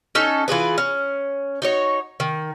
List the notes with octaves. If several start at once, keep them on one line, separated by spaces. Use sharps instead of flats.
C#4 D#4 A4
E3 F4 G#4 B4
C#4
D#4 F#4 C#5
D#3